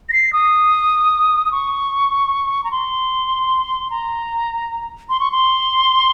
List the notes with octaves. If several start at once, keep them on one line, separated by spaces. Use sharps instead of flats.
A#6
C7
D#6
D#6
C#6
A#5
C6
A#5
C6
C#6
C6